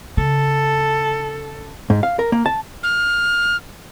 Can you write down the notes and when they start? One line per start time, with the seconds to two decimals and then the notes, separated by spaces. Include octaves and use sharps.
0.17 C#3 A4
1.90 G#2
2.03 F5
2.19 A#4
2.32 A#3
2.46 A5
2.83 F6